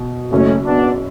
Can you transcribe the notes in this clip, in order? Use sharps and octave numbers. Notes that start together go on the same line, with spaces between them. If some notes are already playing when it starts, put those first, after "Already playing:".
Already playing: B2
F#1 F#2 C#3 A3 C#4
B3 D4